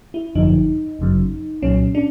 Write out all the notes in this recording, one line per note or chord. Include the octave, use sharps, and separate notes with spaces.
E4
G#1 F#2 D3 F3 D#4
G1 F#2 C#3 F#3
C2 A#2 F#3 C#4
D4